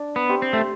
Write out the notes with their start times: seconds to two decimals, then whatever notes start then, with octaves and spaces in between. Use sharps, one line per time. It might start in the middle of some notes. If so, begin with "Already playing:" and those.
Already playing: D4
0.16 B3
0.29 G4 C5 E5
0.42 C4
0.53 A3